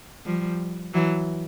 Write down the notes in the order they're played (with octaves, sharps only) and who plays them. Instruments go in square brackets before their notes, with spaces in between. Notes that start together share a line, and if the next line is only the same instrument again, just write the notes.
[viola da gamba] F3 G3
E3 F#3